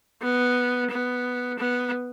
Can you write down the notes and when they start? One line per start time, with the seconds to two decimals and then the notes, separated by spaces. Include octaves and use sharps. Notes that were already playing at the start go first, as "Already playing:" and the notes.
0.22 B3
0.90 B3
1.59 B3